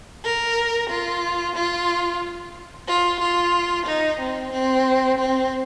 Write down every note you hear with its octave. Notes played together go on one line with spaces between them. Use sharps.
A#4
F4
F4
F4
F4
D#4
C4
C4
C4